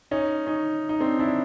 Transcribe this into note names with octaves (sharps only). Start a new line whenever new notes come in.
C#4 D#4
C#4 D#4
D#4
C4 D4
D4 E4